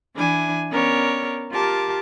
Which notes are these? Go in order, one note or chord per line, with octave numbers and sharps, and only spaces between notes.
E3 D4 E4 G#5
B3 C#4 A#4 C#5 D5
F4 G4 A#4 A5 D6